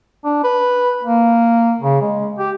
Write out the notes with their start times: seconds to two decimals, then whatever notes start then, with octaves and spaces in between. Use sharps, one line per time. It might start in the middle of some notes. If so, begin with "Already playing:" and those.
0.25 D4
0.44 B4
1.03 A#3
1.81 C#3
2.02 G#3
2.39 G4